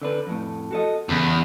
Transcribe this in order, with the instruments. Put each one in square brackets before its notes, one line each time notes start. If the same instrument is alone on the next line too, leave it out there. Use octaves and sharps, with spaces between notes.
[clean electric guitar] D3 D4 B4
F2 A2
F#4 A4 D#5
[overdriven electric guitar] E2 [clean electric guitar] C#3